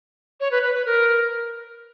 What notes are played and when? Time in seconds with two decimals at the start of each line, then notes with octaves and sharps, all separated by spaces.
0.40 C#5
0.51 B4
0.63 B4
0.74 B4
0.86 A#4